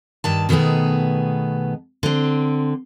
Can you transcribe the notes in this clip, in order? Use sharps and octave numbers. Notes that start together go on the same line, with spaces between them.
G2 D#3 A5
B2 D#3 A3 B3 G#4
D3 C4